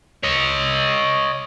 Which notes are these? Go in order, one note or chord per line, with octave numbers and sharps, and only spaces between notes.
C#5 D#5